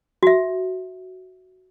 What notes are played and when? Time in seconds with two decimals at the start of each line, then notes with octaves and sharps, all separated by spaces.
0.23 F#4 E5